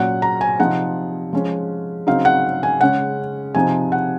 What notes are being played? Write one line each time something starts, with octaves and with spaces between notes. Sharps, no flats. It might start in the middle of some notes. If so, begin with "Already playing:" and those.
Already playing: A#2 F#3 C#4 F#5
A#5
G#5
C3 F3 C4 D#4 F#5
F3 G#3 C#4
C#3 F#3 C4 D#4 F5
F#5
G#5
C#3 G#3 C#4 F#5
C3 F3 C4 D#4 G#5
F#5